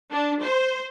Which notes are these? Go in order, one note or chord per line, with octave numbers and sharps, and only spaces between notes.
D4
C5